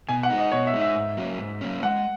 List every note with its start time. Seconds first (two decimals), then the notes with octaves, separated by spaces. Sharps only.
0.09 B2 G#5
0.23 F#5
0.30 G#3 D#4
0.38 D#5
0.52 B2 C#5
0.67 E5
0.74 G#3 D#4
0.81 E5
0.96 G#2
1.17 F#3 A#3 C#4
1.39 G#2
1.61 F#3 A#3 C#4
1.83 G#3 F#5